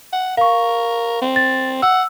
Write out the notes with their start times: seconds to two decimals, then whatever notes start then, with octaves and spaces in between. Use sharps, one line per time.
0.13 F#5
0.37 A#4 F5 C#6
1.22 C4
1.36 A6
1.82 F#5 E6